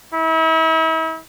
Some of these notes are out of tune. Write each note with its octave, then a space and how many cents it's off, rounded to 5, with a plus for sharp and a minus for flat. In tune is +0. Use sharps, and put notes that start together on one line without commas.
E4 -40